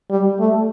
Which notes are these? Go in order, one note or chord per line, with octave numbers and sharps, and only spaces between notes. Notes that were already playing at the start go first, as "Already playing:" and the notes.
G3
A3